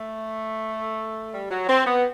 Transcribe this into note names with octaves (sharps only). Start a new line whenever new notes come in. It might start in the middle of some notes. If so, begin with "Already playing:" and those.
Already playing: A3
G3
F#3
C4
B3